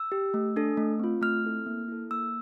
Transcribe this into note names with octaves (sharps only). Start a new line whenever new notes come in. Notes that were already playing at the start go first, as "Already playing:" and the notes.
Already playing: E6
G4
A3
D4 A4
A3
C4 F4
A3 F6
C4 E4 A4
A#3
E4 A4
A#3 E6